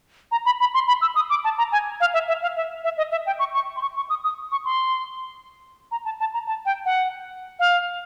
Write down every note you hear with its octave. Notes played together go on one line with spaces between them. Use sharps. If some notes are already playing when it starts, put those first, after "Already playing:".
A#5
B5
B5
C6
B5
E6
D#6
D6
A5
A#5
G#5
F5
E5
E5
F5
E5
E5
D#5
E5
G5
C#6
C#6
C6
C#6
C#6
D#6
D#6
C#6
C6
A#5
A5
A5
A#5
A5
G5
F#5
F5